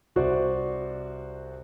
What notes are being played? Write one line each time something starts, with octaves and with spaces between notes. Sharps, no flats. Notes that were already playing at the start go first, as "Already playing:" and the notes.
C2 F#4 C5 D5